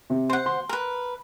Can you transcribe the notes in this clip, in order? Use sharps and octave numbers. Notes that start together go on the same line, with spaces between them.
C3
C5 F#5
C6
A#4 B4